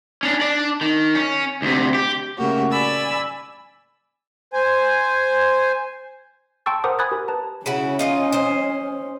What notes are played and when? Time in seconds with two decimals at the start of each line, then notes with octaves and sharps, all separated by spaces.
0.23 C#4 D4
0.41 D4 D5
0.81 D#3
1.15 C#4
1.62 D2 C3
1.94 G4
2.37 C#3 A3 A#3 F#4 G4
2.71 D5 G#5 B5 E6 A6
4.53 C5 G#5
6.66 G5 A5 C6 C#6 E6 A6
6.84 A#4 C5 F#5 A#5 D6 D#6
6.99 G#5 B5 D#6 F#6 G#6 A6
7.12 G4 A#4
7.28 B4 A5 A#5
7.66 C#3 C#4 E4 F#4
7.99 D#4 F4 D#5
8.32 C5 D#5